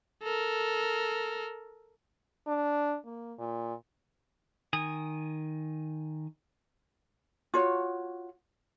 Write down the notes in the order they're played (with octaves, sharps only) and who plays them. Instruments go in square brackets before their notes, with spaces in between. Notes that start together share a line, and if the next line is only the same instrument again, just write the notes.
[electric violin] A4 A#4
[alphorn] D4
A#3
A#2
[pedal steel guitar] D#3 G#5 D#6
[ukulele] F4 F#4 C#5